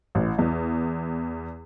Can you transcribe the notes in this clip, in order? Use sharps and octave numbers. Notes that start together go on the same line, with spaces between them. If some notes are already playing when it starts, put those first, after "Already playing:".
A1
E2